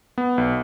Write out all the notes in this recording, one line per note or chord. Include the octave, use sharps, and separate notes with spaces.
B3
B1